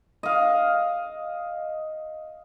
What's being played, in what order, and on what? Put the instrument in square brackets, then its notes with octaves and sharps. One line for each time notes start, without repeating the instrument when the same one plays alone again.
[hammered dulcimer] D#5 F5